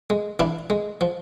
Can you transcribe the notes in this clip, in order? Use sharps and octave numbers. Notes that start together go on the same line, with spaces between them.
G#3
E3 D4 E4
G#3
F3